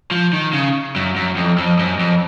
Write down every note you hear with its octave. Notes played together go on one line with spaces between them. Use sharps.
F3
D#3
C#3
F#2
F#2
F2
F2
F#2
F2